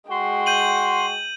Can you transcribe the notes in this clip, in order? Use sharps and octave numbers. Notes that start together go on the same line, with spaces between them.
G#3 F#4 G5 C6
G6 D#7 F#7